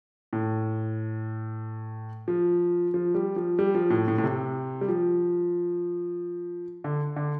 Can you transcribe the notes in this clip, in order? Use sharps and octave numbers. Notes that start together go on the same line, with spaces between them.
A2
F3
F3
G3
F3
G3
F3
A2
A2
A2
C3
G3
F3
D3
D3